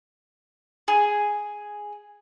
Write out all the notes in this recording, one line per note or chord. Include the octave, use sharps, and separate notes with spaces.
G#4